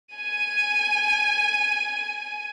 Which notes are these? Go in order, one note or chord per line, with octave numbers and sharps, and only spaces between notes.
G#5 D#7